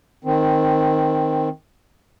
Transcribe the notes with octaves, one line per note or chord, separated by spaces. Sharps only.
D#3 C4